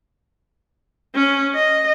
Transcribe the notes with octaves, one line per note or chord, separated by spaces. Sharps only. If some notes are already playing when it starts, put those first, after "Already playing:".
C#4
D#5